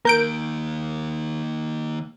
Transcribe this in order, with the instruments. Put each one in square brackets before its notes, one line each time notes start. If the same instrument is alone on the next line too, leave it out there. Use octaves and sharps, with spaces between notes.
[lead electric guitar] D#3 A#3 [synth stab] A#4 G6 D7